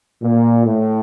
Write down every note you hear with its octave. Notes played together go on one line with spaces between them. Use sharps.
A#2
A2